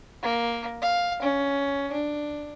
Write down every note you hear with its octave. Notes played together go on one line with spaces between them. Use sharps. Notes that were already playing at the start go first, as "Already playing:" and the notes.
A#3
F5
C#4
D4